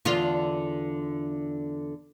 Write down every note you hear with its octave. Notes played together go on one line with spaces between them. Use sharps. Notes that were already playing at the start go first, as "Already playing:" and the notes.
E2 D3 F4